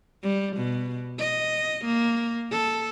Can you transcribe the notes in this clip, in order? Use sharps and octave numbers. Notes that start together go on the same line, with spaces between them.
G3
B2
D#5
A#3
A4